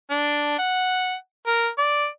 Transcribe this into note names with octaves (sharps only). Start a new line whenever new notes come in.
D4
F#5
A#4
D5